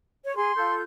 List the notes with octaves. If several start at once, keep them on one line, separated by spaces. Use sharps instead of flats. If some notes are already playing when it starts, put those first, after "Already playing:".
C#5
G#4 C6
F4 A4 G6